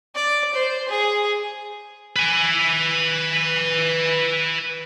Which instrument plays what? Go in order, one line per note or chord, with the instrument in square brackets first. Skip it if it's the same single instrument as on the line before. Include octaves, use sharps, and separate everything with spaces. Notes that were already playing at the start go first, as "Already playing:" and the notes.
[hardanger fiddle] D5
C5
G#4
[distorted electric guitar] B4 G#5